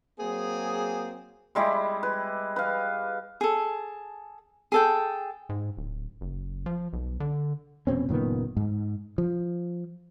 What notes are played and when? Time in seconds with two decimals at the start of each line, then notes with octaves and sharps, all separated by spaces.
0.19 F#3 A#3 C4 G#4
1.55 G3 G#3 E4 G4
2.03 B4
2.56 B4 F5
3.41 G#4 A4
4.72 G#4 A4 G5
5.49 G#2
5.77 D1
6.21 F#1
6.66 F3
6.93 B1
7.20 D3
7.87 F1 B2 C4 C#4
8.09 F#1 A#2 D#3 B3
8.57 G#2
9.18 F3